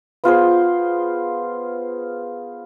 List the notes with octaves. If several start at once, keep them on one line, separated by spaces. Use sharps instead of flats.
B3 F4 G#4 C5